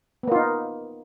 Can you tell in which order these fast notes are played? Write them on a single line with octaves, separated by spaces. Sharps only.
B3 A#3 F4 D#4